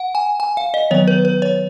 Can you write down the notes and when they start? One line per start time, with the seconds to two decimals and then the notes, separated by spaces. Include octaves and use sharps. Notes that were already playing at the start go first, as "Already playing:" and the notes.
Already playing: F#5
0.15 G#5
0.40 G#5
0.57 F5
0.74 D#5
0.91 D#3 F#3 B3 C#5
1.08 B4
1.25 B4
1.42 C#5